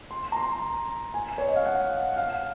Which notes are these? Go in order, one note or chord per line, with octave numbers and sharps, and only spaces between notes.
C6
A#5
C6
G#5
C#5
D#5
F5
F#5
F5